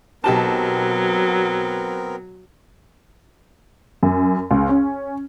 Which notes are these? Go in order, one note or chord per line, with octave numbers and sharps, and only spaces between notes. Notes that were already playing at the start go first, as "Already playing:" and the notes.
B1 F#3 B3 C4 G4 A#4 A5
F#2
C#2
C#4